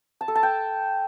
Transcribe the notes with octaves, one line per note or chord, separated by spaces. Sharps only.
A5
A4
A5
G5